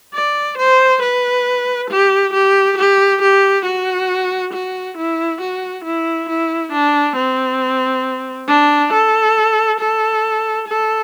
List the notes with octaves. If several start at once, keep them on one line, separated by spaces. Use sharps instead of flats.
D5
C5
B4
G4
G4
G4
G4
F#4
F#4
E4
F#4
E4
E4
D4
C4
D4
A4
A4
A4